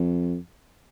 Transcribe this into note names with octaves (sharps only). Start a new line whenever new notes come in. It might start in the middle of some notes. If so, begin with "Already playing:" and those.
Already playing: F2